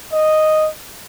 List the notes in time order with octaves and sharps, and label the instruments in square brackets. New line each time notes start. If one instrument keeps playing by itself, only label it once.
[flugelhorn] D#5